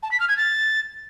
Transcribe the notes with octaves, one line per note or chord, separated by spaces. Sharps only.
A5
B6
F6
G#6
A6